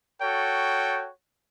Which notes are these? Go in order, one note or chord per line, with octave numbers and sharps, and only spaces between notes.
F#4 A4 C#5 G5